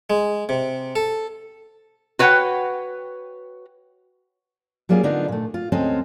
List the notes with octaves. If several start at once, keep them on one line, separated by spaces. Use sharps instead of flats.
G#3
C3
A4
F#4 B4 C#5 F#5 G5
F#3 G3 A#3 C#4 F4 G#4
D3 B3 D4 D#4 F4 A#4
A#2 A3
F4
D2 G#3 C4 C#4 A4 D#5